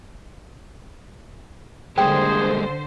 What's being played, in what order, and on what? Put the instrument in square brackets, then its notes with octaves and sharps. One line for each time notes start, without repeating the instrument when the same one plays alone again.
[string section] D3 C5 [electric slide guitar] G3 G#3 A#3 [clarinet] G#4 [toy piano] G5